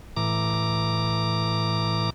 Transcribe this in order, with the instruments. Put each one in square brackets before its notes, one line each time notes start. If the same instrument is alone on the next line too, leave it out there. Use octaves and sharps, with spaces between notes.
[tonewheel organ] A2 E3 A#5 D6